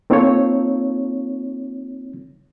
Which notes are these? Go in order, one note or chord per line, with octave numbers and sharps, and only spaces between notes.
A#3 C4 D#4 F4 A4 C#5